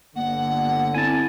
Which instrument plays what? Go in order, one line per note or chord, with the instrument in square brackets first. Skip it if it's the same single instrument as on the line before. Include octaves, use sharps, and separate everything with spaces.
[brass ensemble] G1 D3 [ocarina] A#3 [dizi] F#5
[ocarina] C4 [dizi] E4 [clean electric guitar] G#5 A5